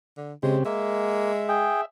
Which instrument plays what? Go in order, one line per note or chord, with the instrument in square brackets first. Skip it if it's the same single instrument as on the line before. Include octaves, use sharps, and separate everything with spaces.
[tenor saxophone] D3
[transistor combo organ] C#3 C4 G4 [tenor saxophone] G#3
[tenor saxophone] G#3 [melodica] A#3 [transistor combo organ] E5
[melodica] G#4 G5